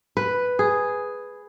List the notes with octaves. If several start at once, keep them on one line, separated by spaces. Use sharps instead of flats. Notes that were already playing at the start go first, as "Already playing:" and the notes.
B4
G#4